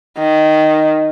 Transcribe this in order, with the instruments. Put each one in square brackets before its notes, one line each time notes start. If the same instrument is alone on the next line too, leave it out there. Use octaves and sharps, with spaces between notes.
[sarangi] D#3